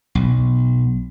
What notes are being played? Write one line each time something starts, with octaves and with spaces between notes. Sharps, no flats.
B1